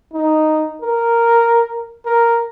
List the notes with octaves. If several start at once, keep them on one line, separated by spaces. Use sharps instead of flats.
D#4
A#4
A#4